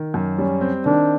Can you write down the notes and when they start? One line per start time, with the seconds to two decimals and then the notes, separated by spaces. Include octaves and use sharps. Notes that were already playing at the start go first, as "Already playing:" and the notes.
Already playing: D#3
0.14 F#2
0.38 G3 C#4
0.61 C4
0.85 D#3 D4